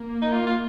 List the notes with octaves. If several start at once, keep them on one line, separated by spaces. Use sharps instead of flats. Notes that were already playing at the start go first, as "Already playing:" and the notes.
Already playing: A#3
D#4
F4
F4